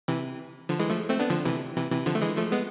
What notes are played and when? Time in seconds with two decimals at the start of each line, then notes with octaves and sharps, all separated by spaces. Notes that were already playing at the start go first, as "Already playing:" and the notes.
0.08 C3 E3
0.69 D3 F3
0.79 E3 G#3
0.90 F3 A3
1.10 A3 C4
1.20 B3 D4
1.30 D3 F3
1.45 C3 E3
1.76 C3 E3
1.91 C3 E3
2.06 D3 F3
2.15 A3
2.22 E3 G#3
2.37 F3 A3
2.52 G#3 B3